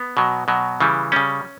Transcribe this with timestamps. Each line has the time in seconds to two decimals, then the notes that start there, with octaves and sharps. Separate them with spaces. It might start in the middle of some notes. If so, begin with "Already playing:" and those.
Already playing: B3
0.17 B2 F#3
0.48 B2 F#3
0.80 C#3 E3 G3
1.12 C#3 G3 C#4